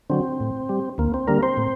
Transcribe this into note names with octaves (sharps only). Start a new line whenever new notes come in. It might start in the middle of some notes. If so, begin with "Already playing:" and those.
D3 F#3 C4
A2
G3
D2 A#3
C4
D3 G3 A#3 A#4
C4 C5
A2